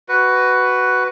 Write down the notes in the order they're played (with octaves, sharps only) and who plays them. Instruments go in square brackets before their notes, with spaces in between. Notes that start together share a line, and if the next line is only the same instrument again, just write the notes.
[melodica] F#4 B4